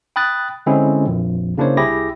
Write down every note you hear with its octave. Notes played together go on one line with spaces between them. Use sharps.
G5 B5 D#6 F#6 A6
D3 G#3 C4 C#4 E4 G#4
A#1 F2
C#3 A#3 D4 E4 C5 C#5
C2 E4 G4 G#4 A#6